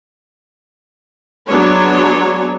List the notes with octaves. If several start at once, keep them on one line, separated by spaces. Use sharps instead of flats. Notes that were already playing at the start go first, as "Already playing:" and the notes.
F#3 G#3 B3 D4 C#5